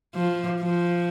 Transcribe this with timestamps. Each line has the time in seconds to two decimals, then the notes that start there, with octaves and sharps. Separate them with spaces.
0.15 F3
0.62 F3